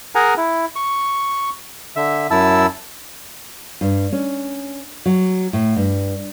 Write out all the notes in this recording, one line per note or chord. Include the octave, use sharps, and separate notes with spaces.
G#4 A#4 F#5 G#5 A#5
E4
C#6
D3 E5
F#2 E4 A5 E6
G2
C#4
F#3
A2
G2